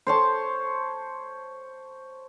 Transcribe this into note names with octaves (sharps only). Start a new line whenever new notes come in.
C5 C#5 A5